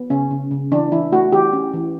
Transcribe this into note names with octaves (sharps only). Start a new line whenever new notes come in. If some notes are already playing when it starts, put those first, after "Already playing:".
Already playing: B3
C#3 C#4
C#3
C#3
E3 D4
E3 E4
A3 F#4
E3 G4
C#4
E3